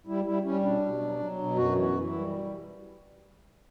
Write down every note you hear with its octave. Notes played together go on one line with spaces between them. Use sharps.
G3 E4
G3 E4
G3 C#4
B2 D4
B2
F#3
F#3
B2
F#2 F#4
E3
F#4
E3
E4
G3